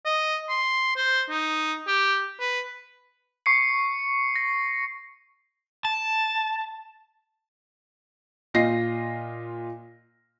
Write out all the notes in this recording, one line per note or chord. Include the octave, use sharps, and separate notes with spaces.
D#5
C6
C5
D#4
G4
B4
C#6 C7 C#7
A#6
A5
A#2 F4 D#5 A#6 C7